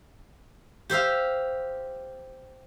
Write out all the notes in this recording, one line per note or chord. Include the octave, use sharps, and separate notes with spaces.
G4 C5 E5 F5